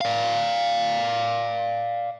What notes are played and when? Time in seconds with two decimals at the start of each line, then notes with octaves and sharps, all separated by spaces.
0.01 D5 F5